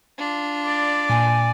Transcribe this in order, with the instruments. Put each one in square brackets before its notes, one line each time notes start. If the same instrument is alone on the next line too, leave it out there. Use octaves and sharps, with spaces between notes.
[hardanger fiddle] D4 F4
[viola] D5
[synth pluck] A#2 [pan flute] G#5